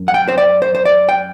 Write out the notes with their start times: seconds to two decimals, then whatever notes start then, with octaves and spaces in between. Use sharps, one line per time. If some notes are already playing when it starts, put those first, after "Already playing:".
Already playing: F#2
0.08 F#5
0.14 G5
0.28 C5
0.38 D5
0.62 C5
0.75 C5
0.85 D5
1.09 G5